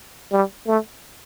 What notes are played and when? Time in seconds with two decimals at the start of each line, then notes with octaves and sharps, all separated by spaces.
0.32 G3
0.67 A3